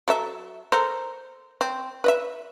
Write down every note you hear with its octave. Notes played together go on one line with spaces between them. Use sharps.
F#3 A4 E5
A4 A#4 C5
C4
B4 D#5 E5